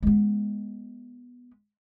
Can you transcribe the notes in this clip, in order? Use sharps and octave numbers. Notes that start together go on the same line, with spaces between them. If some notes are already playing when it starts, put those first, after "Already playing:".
G#3 B3